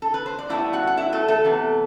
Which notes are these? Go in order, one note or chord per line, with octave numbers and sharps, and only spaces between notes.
A4
B4
C5
D5
A2 G3 B3 E4 E5
F#4 F#5
F#5
E4 E5
A3 A4
A3 A4
C3 E3 B3